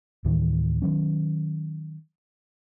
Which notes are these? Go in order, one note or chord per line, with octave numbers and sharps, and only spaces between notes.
D2 A2 D#3 E3
D#3 F#3 C#4